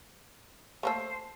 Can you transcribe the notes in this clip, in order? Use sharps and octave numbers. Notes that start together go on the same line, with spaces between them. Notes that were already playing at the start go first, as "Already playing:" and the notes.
A3 A#3 A4 C5